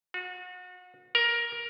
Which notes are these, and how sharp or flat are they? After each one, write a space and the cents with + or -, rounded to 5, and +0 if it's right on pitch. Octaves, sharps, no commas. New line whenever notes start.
F#4 -35
A#4 +15